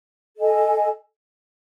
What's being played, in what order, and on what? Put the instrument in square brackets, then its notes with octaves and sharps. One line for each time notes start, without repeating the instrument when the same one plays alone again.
[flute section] A4 D#5 G#5